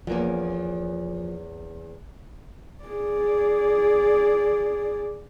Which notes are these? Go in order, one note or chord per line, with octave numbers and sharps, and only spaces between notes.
E2 F3 A#3 C#4
G#4 D5